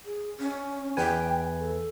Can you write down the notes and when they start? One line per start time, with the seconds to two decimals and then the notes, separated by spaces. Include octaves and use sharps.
0.05 G#4
0.40 C#4
0.97 E2 B4 G5 G#5
1.60 A4